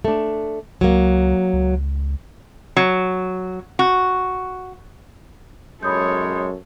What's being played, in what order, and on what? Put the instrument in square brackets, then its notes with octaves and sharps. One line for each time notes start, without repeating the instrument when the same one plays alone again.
[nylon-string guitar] A3 D4
[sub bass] C#2 [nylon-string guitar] F#3 A#3
[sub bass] C#2
[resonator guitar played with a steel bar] F#3
F#4
[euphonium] F#2 [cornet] G#3 [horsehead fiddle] A4 C#5 [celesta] B5 D#6 G6